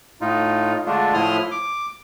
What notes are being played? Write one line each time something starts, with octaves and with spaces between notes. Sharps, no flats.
A2 D#4 F4
D3 G#3 A3 D4 F4
A2 F3 E4 C6 D#6 F6
D6